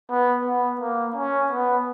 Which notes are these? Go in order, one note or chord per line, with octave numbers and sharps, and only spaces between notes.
B3
B3
A#3
C#4
B3